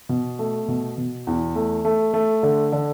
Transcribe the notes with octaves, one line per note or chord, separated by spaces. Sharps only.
B2
A3
B2
B2
E2
A3
A3
A3
D3
D3